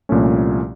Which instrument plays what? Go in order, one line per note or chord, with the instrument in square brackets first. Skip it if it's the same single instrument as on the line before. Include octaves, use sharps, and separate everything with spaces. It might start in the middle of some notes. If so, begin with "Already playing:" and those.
[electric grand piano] C2 A#2 F3 A3 C#4